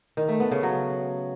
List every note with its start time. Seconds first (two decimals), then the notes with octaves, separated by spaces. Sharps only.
0.17 D#3
0.29 A3
0.40 B3
0.51 C#3
0.63 F#3